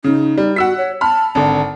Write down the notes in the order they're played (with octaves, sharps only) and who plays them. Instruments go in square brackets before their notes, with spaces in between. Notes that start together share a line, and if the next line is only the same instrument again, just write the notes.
[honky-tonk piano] C#3 [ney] D#4
[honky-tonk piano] G3
[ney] F#4 [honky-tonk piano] F#5 E6 B6
[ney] C#5
[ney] A5 [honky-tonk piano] B5 F6
[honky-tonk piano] G#1 D3 [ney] A5